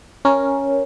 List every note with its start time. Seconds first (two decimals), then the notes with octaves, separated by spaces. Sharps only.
0.25 C#4 A#4